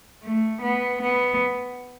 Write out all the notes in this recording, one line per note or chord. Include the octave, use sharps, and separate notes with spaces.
A3
B3
B3